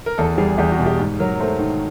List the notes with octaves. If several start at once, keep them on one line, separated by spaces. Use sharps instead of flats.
A#4
E2 A4
G3 G#4
E2 G4
F#4
B2
G4
G#2
F#3 A#4
A3 C5
D#3